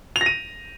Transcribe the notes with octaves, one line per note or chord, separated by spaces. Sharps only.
F7
A#6
D#7